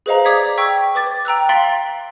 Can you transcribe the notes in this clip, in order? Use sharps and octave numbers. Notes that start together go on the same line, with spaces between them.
G#4 B4 C5 D#5 F5 A#5
D5 D6 D#6 G#6 B6
G5 C#6 E6 G#6 B6
B4 D6 A6
G5 A#5 E6 F#6
F5 C6 A6 B6 D7 F#7